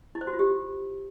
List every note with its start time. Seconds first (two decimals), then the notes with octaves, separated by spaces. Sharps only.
0.15 E4
0.21 C5
0.27 F#4
0.33 F4
0.39 G4